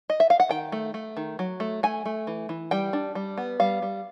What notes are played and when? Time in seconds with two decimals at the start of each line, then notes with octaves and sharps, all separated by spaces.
0.10 D#5
0.20 E5
0.30 F5
0.40 F#5
0.49 D#3 G5
0.72 A3
0.94 A3
1.17 D#3
1.39 F#3
1.60 A3
1.83 A3 G#5
2.05 A3
2.27 E3
2.49 E3
2.71 G3 G5
2.93 D4
3.15 G3
3.38 B3
3.60 G3 F5
3.82 G3